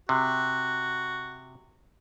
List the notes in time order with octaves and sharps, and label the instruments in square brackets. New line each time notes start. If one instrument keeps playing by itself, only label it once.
[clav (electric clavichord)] C3 [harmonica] F#4